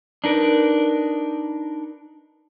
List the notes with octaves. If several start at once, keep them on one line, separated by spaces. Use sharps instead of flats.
D4 D#4 A#4 B4